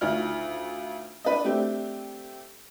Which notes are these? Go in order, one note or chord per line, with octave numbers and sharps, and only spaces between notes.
D2 D#3 F4 F6
D4 B4 D#5
A3 C4 D4 G4